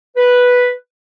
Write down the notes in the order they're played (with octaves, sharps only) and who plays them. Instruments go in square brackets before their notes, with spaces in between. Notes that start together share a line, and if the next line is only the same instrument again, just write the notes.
[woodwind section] B4